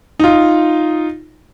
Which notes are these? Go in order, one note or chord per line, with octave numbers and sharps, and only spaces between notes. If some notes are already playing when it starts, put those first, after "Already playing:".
D#4 F4